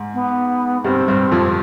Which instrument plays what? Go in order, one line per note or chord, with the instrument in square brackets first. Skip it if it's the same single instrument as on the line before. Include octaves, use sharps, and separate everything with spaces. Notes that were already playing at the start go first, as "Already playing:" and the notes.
Already playing: [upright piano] G#2
[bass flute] B3
[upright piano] G2 G3 [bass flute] C4
[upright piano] G2 G3
F2 F3